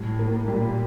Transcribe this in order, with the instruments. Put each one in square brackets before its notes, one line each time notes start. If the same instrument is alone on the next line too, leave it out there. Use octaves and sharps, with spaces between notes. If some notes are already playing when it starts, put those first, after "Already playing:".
Already playing: [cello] A2 [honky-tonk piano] G3
[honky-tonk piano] A#3
[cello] A#2 [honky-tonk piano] G3